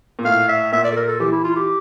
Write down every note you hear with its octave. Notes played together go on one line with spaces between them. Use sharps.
A#2
A2 F5
E5
A#2 E5
D5
A4
A#4
A4
E3 G4
E4
F4
G4